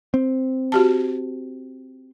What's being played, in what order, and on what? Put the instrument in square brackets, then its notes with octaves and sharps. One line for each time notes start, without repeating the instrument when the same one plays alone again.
[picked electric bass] C4
[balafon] F#4 G4 A5